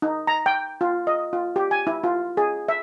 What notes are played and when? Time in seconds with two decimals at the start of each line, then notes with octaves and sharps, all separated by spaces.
0.02 D#4
0.27 A#5
0.46 G5
0.81 F4
1.07 D#5
1.33 F4
1.56 G4
1.71 G#5
1.87 E4
2.04 F4
2.37 G#4
2.68 E5